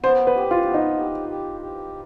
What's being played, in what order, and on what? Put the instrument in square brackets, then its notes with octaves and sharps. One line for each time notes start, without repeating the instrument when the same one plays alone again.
[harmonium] B3 [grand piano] C5
[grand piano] B4
[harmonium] G4
[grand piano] F4
[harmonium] B3
[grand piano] D#4
[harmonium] G4
G4
G4